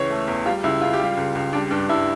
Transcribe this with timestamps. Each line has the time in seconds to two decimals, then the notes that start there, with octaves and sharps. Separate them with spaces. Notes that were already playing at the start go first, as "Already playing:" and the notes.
Already playing: C#2 E3 C#5
0.10 A3
0.28 E2
0.45 G3 F4
0.64 C#2 E4
0.81 C#2 F4
0.93 G4
0.99 G3 F4
1.17 C#2
1.35 C#2
1.53 G3 D4
1.71 G2 D4
1.89 G2 E4